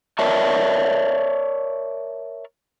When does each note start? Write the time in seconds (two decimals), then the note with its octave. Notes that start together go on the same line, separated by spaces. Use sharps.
0.19 A#4 C#5 D5 E5 A5